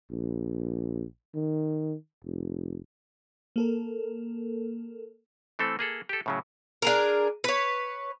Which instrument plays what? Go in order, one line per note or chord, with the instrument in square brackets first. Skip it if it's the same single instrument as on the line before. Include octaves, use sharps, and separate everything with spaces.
[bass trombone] A#1
D#3
F1
[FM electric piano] A#3 A4 A#4
[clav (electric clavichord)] E3 A3 C4 A4
A#3 G#4 A4
G4 A4
A2 C#3 F#3
[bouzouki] D4 G#4 A#4
B4 C#5